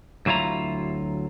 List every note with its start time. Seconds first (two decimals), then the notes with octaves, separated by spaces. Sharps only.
0.26 D2 F#3 E4 F4 A#5